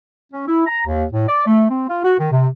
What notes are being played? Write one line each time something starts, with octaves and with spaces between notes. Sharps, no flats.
C#4
E4
A#5
D#2
A2
D5
A3
C4
F4
F#4
D#3
C3